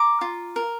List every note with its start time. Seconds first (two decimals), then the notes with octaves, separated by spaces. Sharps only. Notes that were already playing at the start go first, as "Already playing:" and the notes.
Already playing: A#5 D6
0.21 F4
0.56 A#4